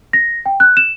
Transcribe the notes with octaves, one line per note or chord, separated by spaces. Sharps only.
A#6
G5
F#6
E7